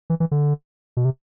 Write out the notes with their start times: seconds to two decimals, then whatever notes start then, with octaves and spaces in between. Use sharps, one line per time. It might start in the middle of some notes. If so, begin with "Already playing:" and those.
0.10 E3
0.20 E3
0.31 D3
0.97 B2
1.05 C3